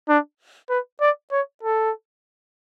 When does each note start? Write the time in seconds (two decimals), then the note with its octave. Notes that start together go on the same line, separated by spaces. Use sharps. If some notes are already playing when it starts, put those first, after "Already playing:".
0.09 D4
0.69 B4
1.01 D5
1.32 C#5
1.63 A4